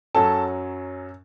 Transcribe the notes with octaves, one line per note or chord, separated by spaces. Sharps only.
F#2 F#3 C#4 A4 A5